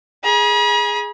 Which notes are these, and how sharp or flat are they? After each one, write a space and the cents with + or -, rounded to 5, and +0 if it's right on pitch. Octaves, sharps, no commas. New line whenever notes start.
G#4 +0 B5 -45